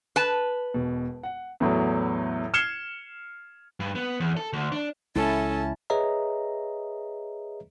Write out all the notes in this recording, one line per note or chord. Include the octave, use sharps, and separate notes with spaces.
B4 A5
E1 B2
F#5
E2 A2 F#3
F6 G#6 C7 C#7 E7 G7
G2
B3
E2
A4
D2
D4
C#2 G#3 C#4 E4 A4 A5
G#4 B4 C#5 D#5 E5 A#5